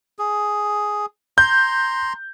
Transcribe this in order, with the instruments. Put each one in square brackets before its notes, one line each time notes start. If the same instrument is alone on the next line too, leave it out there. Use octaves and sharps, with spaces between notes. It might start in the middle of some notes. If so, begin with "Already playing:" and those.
[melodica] G#4
[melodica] A#5 C6 [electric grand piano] G6